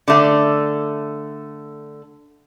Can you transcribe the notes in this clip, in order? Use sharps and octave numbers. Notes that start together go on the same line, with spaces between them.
D3 A3